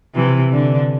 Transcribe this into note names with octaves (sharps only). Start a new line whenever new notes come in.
C3 E3
D3